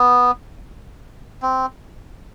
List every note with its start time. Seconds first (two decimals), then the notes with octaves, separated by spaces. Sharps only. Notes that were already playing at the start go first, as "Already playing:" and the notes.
Already playing: B3
1.42 C4